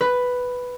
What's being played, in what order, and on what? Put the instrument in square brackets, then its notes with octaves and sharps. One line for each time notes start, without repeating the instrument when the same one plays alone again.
[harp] B4